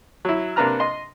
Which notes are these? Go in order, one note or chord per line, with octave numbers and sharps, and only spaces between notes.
F#3 E4
C3 A#3 D4 B4 A#5 F6
D#5 C6